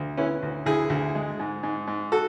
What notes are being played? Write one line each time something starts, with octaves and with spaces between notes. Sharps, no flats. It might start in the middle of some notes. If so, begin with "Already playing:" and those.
Already playing: D2
B3 C#4 E4
D2
D2 E4 G#4
D2
G#3
G#2
G#2
G#2
F#4 A4